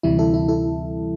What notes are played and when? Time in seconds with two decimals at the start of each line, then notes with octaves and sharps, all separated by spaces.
0.03 D2 C3 E3 G3 E4
0.19 E4 A4
0.34 E4
0.48 E4 A4